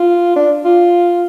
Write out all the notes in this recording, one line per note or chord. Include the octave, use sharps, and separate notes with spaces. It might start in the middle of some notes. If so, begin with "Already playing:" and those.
Already playing: F4
D4
F4